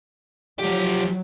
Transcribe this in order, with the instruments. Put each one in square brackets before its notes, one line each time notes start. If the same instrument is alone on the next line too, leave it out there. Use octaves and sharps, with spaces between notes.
[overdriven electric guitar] F3 G4 [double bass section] F#3